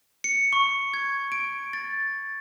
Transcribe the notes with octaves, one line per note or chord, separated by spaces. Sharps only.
C#7
C#6
G#6
D7
A6